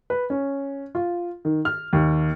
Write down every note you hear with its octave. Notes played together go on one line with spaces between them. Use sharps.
B4
C#4
F4
D#3
F6
D#2